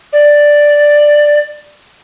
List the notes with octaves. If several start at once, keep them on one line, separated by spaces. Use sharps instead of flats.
D5